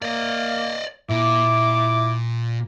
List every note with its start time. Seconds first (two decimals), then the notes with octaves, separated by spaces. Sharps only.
0.02 A#3 D5 D#5
1.09 A#2 E4 D6